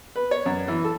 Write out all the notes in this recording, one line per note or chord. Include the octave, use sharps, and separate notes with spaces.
B4
C#5
F#2
E3
A4